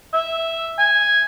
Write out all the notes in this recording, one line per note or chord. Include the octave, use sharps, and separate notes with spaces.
E5
G#5